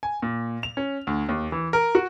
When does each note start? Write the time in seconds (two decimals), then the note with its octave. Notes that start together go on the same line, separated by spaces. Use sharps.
0.03 G#5
0.22 A#2
0.63 F7
0.77 C#4
1.07 D2
1.29 D#2
1.52 E3
1.73 A#4
1.95 F#4